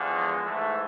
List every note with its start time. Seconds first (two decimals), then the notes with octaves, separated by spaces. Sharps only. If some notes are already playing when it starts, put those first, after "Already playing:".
Already playing: E2 D3 F3
0.16 G#3
0.46 G#2 E3 A3